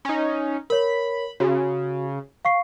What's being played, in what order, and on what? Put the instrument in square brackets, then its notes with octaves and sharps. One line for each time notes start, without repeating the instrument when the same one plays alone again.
[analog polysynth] C#4 D#4
[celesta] A#4 C#5 [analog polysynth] B5
[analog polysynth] C#3 [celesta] F#4
[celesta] F5 C#6 C7